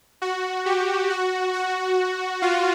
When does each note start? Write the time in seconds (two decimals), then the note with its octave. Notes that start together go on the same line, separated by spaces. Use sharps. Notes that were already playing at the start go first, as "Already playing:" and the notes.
0.22 F#4
0.66 G4
1.10 F#4
1.53 F#4
2.42 F4